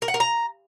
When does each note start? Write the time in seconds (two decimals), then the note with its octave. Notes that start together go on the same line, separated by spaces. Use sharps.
0.02 A#4
0.08 F#5
0.14 A#4
0.20 A#5